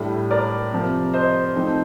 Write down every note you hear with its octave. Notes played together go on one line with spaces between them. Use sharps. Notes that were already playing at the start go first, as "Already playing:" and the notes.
Already playing: A2 G3 D4
A#4 D5
C3 F3 A#3
C5 D#5
F3 A3 C4 D#4